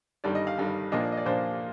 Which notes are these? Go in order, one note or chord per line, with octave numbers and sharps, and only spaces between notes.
G1 G2 D#3 G3 D5
D#5
F5
G1 G2 D#3 G3
A#2 F3 A#3 D4 D#5
D5
D#5
D5
A#2 F3 A#3 D4 C5